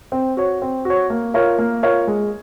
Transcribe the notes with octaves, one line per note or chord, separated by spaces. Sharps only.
C4
F#4 C#5
C4
F#4 C#5
A#3
F4 A#4 C#5 F5
A#3
F4 A#4 C#5 F5
G#3